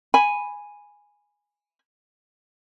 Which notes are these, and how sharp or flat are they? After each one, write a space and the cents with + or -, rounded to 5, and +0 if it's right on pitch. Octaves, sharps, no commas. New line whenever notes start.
G#5 -5 B5 +0